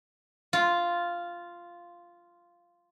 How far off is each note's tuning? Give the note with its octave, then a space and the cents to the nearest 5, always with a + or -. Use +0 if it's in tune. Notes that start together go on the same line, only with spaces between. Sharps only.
F4 -5